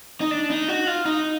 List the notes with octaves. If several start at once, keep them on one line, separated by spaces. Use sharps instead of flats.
D#4
D4
D#4
F#4
F4
D#4